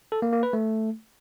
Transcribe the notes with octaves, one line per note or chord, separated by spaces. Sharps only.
A4
A#3
A#3
B4
A3